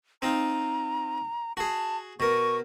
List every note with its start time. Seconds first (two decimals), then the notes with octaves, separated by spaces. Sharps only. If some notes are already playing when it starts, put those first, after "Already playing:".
0.22 C4 D#4 F4 A#5
1.57 F#4 G#4 A5
2.20 B2 A#4 C#6